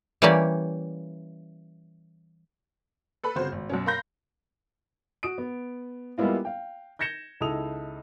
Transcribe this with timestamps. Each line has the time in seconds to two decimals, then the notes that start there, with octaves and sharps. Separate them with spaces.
0.22 E3 G3 A#3 C#4 G4 D5
3.24 A4 B4 B5
3.36 G1 C#3 C4 F#4 C5
3.52 G#1
3.69 F#2 B2 C#4
3.86 A#4 F5 B5 C6 G6 A#6
5.23 F#4 D#6 D7
5.38 B3
6.18 G3 G#3 A#3 B3 E4 F4
6.45 F5 G5
6.99 G6 G#6 A#6 C#7 E7 G7
7.40 C#2 D#4 E4 A4 D#6 F7